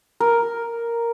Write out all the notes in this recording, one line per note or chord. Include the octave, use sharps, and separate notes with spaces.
A#4